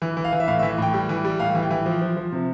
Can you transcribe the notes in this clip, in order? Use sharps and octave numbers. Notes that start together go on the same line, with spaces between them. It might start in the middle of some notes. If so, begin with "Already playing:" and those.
E3
E3
F5
E3
E5
A2 F5
E5
E3
A2 G5
G3
E3
G3
A2 F5
E3
G5
E3
F3
F3
F3
C3